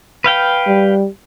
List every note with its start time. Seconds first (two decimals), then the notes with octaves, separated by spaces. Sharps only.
0.24 B4 F5 G5
0.67 G3